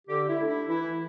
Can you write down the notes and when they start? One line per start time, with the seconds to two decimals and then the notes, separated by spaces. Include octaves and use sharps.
0.08 D3 G4
0.28 E4
0.38 A3 D4
0.48 E4
0.68 E3 E4